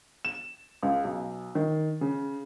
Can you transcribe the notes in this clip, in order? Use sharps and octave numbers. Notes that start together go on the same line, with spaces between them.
E7
C#2
B1
D#3
C#3